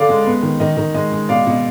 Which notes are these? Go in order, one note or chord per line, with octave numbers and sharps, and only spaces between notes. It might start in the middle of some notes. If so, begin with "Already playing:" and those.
Already playing: D3 D5 F5
G#3
B3
D#3
D#3 D#5
D#3
G#3 D#5
G#3
B2 D5 F5
B2